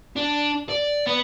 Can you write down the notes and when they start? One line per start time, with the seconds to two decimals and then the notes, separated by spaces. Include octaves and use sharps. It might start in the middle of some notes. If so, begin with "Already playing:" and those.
0.16 D4
0.69 D5
1.07 B3